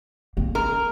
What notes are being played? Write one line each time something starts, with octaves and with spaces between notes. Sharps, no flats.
A#3 C4
A#4